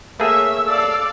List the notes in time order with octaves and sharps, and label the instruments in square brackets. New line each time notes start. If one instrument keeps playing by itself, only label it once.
[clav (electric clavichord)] A3 A#3 G#4 [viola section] C#5 E5 [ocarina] E6
[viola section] A4 D5 F5